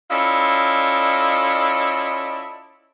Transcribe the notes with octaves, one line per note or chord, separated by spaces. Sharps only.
C#4 E4 F4 A4 D5 D#5